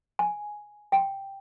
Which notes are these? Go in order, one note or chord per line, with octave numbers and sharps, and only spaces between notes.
G#5
G5